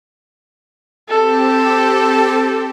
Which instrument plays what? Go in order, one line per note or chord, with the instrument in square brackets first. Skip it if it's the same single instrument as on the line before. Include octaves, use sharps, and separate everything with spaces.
[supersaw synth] C4 G4 [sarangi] A4